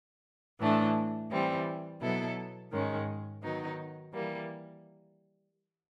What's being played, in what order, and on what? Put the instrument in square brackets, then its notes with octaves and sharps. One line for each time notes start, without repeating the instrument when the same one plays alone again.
[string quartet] A2 E3 A3 D4
E3 G3 C4
B2 F#3 B3 E4 A4
G#2 D#3 G#3 C#4
D#3 F#3 B3 D#4
E3 G3 A#3